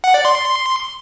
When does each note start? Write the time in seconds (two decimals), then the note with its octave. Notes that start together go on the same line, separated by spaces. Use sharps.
0.04 F#5
0.14 D5
0.25 C6